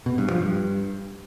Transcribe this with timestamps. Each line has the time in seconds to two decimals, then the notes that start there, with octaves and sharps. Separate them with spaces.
0.06 B2
0.18 G2
0.30 F3
0.42 G2